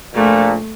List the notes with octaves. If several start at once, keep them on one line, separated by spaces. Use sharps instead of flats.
A#1 A#2 A3